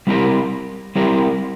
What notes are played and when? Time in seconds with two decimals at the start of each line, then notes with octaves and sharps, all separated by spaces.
0.07 G3 C4 E4 G4 A#4
0.96 G3 C4 E4 G4 A#4